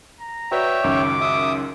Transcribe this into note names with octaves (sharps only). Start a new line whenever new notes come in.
A#5
F#4 B4 C#5 D5 E5 G5
C#2 F#2 D#3 D6
E5 D#6